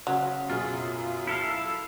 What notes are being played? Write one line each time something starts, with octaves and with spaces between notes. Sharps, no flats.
C#3 F#3
F#2 B2 F4 G#4
E4 A4 F5